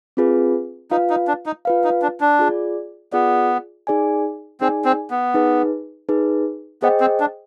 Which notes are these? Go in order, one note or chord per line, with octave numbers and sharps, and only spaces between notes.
C4 F4 G#4 B4
D#4 F4 B4 F5
D#4
D4
D#4
F4 B4 F5
D#4
D4
D4
F4 G#4 D5
B3 F4 G#4 D5
D#4 G#4 D5 G#5
C4 D#4 G#4 D5 G#5
C4
B3
D#4 G#4 B4
D#4 G#4 B4
B3 G#4 C5 D#5 G5
C4
D4